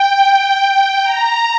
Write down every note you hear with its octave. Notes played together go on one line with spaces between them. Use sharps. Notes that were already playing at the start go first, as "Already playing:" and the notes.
Already playing: G5
G5
A#5